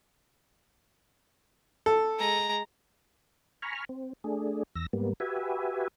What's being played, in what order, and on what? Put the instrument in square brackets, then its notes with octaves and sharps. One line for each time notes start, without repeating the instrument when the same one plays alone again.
[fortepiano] A4
[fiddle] G#3 A#5
[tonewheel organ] G#5 A#5 B5 C#6 F6
C4
A3 D4 G#4
E2 E6 A#6
G#2 G3 A#3 B3
F#4 G4 B4 E5 G#5